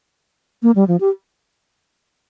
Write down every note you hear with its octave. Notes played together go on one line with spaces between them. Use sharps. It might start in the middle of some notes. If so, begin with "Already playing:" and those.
A#3
G3
F3
G4